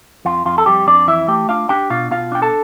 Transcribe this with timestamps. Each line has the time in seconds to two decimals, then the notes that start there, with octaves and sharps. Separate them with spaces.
0.25 F2 F4
0.46 F2 F4
0.58 A4
0.66 F2 G3 G4
0.87 F2 D4 D5
1.08 E3 E4 E5
1.28 A3 G4 G5
1.49 D4 F4 F5
1.69 D4 G4 G5
1.90 B2 F4 F5
2.11 B2 F4 F5
2.32 D4 G5
2.42 A4 A5